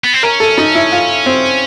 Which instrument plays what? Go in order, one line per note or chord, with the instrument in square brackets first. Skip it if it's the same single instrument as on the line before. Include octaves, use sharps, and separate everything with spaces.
[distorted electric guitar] B3
C4
[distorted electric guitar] C#4 [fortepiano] A#4
[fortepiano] A4
D#4
E4
F4
C4